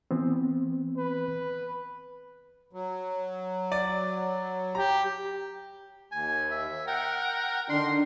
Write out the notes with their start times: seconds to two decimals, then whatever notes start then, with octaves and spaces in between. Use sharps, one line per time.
0.11 E3 B3 C4
0.97 B4
2.73 F#3
3.72 D5
4.75 G4 A#5
6.12 D#2 G#5
6.51 E5
6.87 A#4 F#5 G5
7.69 D3 D#3 D4 C6